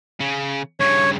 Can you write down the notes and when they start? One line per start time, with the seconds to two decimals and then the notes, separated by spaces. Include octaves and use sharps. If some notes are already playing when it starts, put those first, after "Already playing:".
0.20 C#3
0.80 G2 C#3 C#5